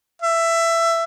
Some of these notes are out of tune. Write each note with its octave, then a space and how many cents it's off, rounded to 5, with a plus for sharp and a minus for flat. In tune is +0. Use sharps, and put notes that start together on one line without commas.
E5 +15